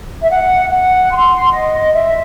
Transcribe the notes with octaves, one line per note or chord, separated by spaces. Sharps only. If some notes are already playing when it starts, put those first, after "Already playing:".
E5
F#5
F#5
C6
D#5
E5